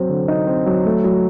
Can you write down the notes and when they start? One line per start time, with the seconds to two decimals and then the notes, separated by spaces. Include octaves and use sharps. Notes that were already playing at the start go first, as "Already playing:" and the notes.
Already playing: F#3 C4
0.09 D3
0.28 D#4
0.47 C4
0.66 F#3
0.85 A3
1.04 F#3